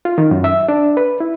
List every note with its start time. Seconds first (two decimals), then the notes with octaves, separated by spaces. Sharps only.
0.05 F4
0.18 D#3
0.31 F#2
0.44 E5
0.68 D4
0.97 B4
1.20 E4